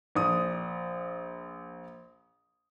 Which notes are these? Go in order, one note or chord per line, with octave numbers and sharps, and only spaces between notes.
A#1 D#6